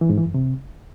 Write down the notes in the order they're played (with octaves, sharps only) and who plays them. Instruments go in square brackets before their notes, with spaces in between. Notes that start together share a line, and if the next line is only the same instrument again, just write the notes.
[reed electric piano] E3
G#2
E3
F#2
C3